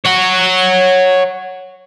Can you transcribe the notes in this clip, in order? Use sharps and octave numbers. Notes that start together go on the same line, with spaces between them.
C#5 F#5